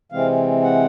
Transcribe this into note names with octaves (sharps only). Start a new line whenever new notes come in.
C3 E3 G#3 C4 F5
F#5